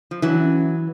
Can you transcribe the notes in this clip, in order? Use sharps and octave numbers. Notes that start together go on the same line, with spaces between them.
F3
E3 F#3 D4
C#4